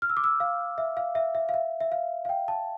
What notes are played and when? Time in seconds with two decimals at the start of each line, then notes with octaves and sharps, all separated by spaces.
0.02 F6
0.10 E6
0.17 D6
0.24 E6
0.40 F5
0.78 E5
0.97 F5
1.15 E5
1.35 E5
1.49 F5
1.54 E5
1.80 E5
1.92 F5
2.25 F5
2.29 G5
2.48 A5